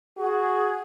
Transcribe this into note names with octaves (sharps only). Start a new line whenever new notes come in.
F#4 G#4